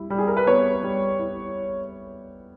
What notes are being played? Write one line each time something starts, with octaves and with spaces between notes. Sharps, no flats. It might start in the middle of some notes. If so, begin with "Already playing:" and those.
Already playing: G3 E4
G3
G#4
A#4
B4
B3 C#5
G3
E4